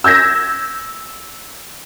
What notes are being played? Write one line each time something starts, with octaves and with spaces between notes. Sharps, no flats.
E6 G6 G#6 A#6 B6